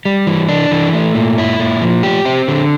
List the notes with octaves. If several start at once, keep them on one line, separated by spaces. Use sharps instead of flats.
G3
E3
D4
E3
A3
A#2
E4
A#2
F3
G4
C4
D3